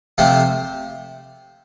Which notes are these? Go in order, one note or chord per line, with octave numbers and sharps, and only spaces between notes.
C3 F3 A3